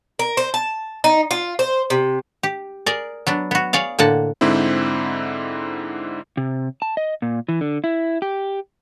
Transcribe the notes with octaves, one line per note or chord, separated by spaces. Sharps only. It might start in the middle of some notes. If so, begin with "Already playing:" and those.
A#4
C5
A5
D#4
F4
C5
C3
G4
G#4 A#4 D5
F#3 B3 D4
B3 F#4
G#4 C#5 D5 F5
A2 D3 A#3 F#5 A5
G#2 D3 C4 E4
C3
A5
D#5
A#2
E3
D3
E4
G4